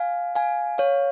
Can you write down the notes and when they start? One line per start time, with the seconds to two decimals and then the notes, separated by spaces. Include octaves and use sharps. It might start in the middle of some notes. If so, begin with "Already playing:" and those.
Already playing: F5 G#5
0.35 F5 G#5
0.78 C#5 F5